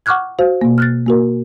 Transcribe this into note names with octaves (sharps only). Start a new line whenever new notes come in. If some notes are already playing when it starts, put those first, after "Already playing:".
F#5 C#6 D6 F6 F#6 G#6
F#4 C5 F5
B2 A#3
F6 F#6 A6
A#3 F#4 A#4